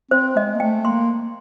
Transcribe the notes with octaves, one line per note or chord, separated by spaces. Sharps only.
C4 C5
G#3 D#5
A#3
A3 G5
A#3 C6